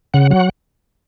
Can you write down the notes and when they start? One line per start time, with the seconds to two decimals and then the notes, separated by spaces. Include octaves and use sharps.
0.14 C#3 F#5
0.30 F#3 F#5